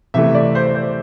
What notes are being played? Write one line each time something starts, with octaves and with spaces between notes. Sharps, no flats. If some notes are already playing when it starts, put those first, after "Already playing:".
C3 E3 A3 E5
D5
C5
C5